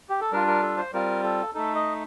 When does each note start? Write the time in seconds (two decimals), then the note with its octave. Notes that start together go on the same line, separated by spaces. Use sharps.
0.09 G4
0.21 A4
0.32 G3 D4 F4 A#4
0.47 A#4
0.62 A4
0.77 C5
0.93 G3 C4 F4 A#4
1.24 A4
1.54 A3 D#4 A4
1.75 D#5